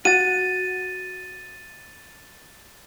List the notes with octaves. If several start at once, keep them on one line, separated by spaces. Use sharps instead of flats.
F#4 F#5 A6 D#7